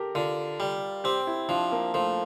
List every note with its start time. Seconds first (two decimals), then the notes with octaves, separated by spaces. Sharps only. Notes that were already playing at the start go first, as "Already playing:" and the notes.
Already playing: G4 A4 A#4
0.15 D3 F4
0.60 G3
1.04 C4 G4
1.27 E4
1.49 F3 D4
1.72 A#3
1.94 F3 A3